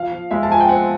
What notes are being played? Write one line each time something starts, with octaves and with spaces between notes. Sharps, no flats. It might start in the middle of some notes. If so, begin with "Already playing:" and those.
Already playing: F3 F5
F3
G#3 E5
A5
F3 G#5
G5
C4 F#5